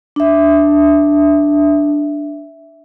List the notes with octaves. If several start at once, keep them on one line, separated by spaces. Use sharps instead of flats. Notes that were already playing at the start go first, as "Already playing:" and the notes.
D4 E5